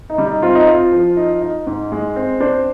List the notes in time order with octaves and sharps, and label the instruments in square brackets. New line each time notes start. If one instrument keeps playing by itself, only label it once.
[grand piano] D#4
[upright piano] G3
[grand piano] D#4
[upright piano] C4 [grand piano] F4
[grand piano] D#4
[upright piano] C4 [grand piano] F4
[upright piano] F3
D#4
D#4
G#2
G#3
C4
[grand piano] D4 [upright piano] C5